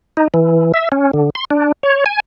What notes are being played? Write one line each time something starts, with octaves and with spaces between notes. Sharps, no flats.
D#4
E3
E5
C#4
D3
C6
D4
C#5
G#5